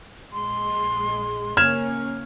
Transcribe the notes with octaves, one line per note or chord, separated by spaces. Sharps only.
A#1 G#3 C6
C#3 A#3 C#4 F6 G#6 E7